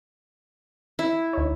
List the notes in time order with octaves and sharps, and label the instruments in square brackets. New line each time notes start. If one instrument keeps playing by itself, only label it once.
[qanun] E4
[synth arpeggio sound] D2 D#4 C#5